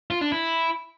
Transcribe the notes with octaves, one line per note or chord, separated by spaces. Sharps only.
F4
D4
E4